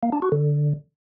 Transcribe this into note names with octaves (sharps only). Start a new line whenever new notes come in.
A#3
D4
F#4
D3